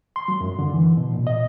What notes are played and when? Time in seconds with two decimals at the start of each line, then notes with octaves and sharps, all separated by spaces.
0.16 C6
0.28 F#3
0.41 F#2
0.59 D3
0.73 E3
0.97 B2
1.13 A#2
1.27 D#5